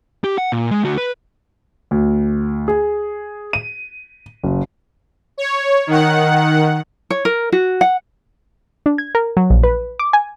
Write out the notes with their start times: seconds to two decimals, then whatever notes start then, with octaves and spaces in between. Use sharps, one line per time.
0.24 G4
0.38 F#5
0.52 A#2
0.71 G#3
0.84 D2 F#4
0.98 B4
1.91 D2
2.68 G#4
3.53 D#7
4.44 F#1
5.38 C#5
5.87 D#3 F#5
7.10 C#5
7.25 A#4
7.52 F#4
7.81 F#5
8.86 D4
8.98 G#6
9.15 A#4
9.37 F#3
9.50 A#1
9.63 B4
9.99 D6
10.13 G#5